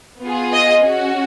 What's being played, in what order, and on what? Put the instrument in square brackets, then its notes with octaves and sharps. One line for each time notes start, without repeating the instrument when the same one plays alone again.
[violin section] B3 F4 G#4
D#5
C#4 F#4